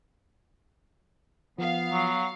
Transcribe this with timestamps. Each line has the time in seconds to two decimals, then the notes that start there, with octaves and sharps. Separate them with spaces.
1.58 F3 B3 F5
1.92 F#3